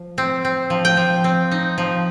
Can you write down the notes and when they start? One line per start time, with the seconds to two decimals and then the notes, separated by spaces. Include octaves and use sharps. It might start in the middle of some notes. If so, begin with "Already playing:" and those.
Already playing: F3
0.18 C4
0.45 C4
0.70 F3
0.85 G5
0.97 F3
1.24 C4
1.51 D#4
1.78 F3